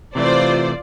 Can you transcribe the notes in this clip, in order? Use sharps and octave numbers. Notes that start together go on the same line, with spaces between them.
C3 E3 A3 F4 C5 D5